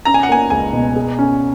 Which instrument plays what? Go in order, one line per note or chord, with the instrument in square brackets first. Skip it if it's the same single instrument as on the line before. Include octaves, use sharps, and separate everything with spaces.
[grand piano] C#4 [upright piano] A#5
[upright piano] G#5
F#5
[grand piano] A#3 [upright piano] G#5
[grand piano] C#2 [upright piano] G#5
[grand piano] B2
G#4
C#4